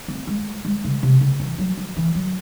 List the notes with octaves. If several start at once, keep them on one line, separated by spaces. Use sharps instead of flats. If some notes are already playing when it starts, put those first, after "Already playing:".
C4
G#3
G#3
C#3
C3
C#3
E3
F#3
F#3
E3
F#3